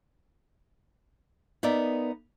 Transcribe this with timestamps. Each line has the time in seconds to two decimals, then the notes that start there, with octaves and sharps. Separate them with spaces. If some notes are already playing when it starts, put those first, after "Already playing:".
1.63 B3 D#4 A#4 D5 E5